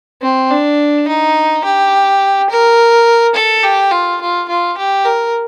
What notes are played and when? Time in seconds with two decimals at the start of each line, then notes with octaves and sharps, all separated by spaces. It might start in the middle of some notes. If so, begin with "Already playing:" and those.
0.22 C4
0.51 D4
1.08 D#4
1.65 G4
2.50 A#4
3.35 A4
3.63 G4
3.91 F4
4.21 F4
4.49 F4
4.78 G4
5.05 A#4